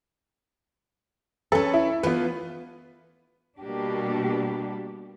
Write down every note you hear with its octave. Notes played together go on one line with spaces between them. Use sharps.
C#4 A4 B4
E4
E3 A3 B3 F4 B4
B2 G3 A#3 D4 G4